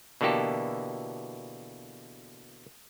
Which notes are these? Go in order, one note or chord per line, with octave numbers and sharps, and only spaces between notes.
B2 D3 E3 A#3 G4 A4